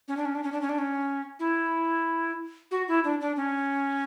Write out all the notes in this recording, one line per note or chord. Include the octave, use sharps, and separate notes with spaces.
C#4
D4
C#4
D4
C#4
D4
C#4
D4
C#4
E4
F#4
E4
D4
D4
C#4